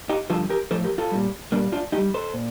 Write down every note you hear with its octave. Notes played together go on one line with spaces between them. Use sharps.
D#4 G4
G2 D3 F3 F4 A4
G4 A#4
A2 F3 A4 C5
G4 A#4
F4 A4
A#2 G3
A#2 G3 A#3 D4
D4 F4
A2 D#4 G4
G3
A4 C5
A#2